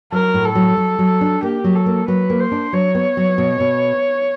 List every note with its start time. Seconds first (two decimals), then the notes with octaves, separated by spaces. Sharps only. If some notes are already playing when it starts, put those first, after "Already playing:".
0.12 F#3 A#4
0.34 A2
0.45 A4
0.55 F#3
0.77 F#3
0.99 F#3
1.21 D4
1.43 A#3 G4
1.64 F#3
1.75 A4
1.86 A#3
2.08 F#3 B4
2.30 A#3
2.40 C5
2.52 D4
2.73 F#3 C#5
2.95 B3
3.17 F#3
3.38 B2
3.60 B2